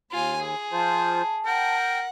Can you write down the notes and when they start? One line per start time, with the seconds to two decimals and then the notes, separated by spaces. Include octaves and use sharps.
0.11 D#2 F4 G#5
0.41 G#4
0.73 F3 F4 C5 A5
1.46 A#4 F#5 G5